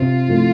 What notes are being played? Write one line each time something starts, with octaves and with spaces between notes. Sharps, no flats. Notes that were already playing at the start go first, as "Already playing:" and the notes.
Already playing: C3 F4
F3 A3 E4